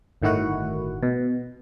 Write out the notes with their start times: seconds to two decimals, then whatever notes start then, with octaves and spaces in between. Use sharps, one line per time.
0.22 G1 A2 D#3 E4 F#4 F#5
1.03 B2